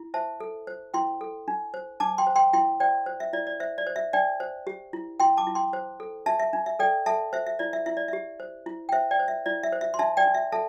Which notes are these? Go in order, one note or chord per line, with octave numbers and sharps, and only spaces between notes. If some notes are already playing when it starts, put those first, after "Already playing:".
Already playing: E4
C5 E5 A5
A4
C5
E4 G5 C6
A4
D4
C5
D4 A5 D6
G5 C6
C5
G5 C6
E4 G5 C6
C5 D5 G5
C5
E5
E4 D5
D5
C5 E5
D5
C5
E5
D4 D5 G5
C5
G4
E4
E4 G5 C6
A5 D6
E4
G5 C6
C5
A4
D4 E5 A5
E5
D4
E5
A4 D5 G5
A4 E5 A5
C5 E5
E5
E4 D5
E5
E4 E5
D5
G4 E5
C5
E4
G5
C5 E5
D5 G5
C5
E5
E4 D5
E5
C5
E5
C6
D4 E5 A5
D5 G5
D4
E5
A4 E5 A5